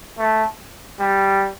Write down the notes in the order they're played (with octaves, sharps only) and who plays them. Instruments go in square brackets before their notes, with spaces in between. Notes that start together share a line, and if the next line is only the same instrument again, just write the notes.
[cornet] A3
G3